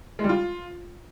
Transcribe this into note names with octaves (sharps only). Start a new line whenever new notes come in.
G#3
G3
F4